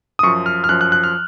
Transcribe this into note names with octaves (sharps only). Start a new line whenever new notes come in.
D#6
F#2 F3 C#6
F6
F6
F#2 F3 F#6
F#6
F#6
F6